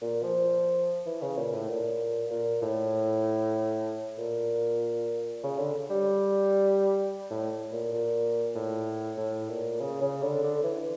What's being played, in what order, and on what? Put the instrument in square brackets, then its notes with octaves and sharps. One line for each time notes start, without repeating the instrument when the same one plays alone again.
[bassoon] A#2
F3
E3
C#3
A#2
A2
A#2
A#2
A2
A#2
C#3
D3
G3
A2
A#2
A#2
A2
A2
A#2
C#3
C#3
D3
D3
E3